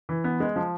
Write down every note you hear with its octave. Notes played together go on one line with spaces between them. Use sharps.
E3
B3
G#3
F3